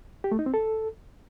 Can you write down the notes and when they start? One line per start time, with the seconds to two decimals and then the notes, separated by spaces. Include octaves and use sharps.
0.24 G4
0.32 A3
0.39 D#4
0.46 C4
0.54 A4